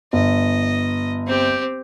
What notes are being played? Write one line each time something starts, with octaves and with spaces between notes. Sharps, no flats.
G1 D#5
C4 G4